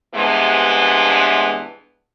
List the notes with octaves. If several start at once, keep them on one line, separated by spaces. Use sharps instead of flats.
G2 C3 E3 G#3 B3 D4